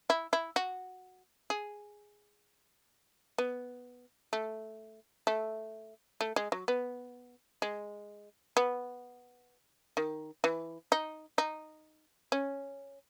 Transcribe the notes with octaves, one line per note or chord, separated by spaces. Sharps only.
E4
E4
F#4
G#4
B3
A3
A3
A3
G#3
F#3
B3
G#3
B3
D#3
E3
D#4
D#4
C#4